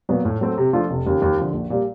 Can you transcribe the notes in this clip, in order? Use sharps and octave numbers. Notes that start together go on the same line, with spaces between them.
A#2 F#3 B3
A2
F#3 A3 C4
C3
F3 A3 D4 F4
F1
D#2 C#3
D#2
D3 F3
A#1
A#2 G3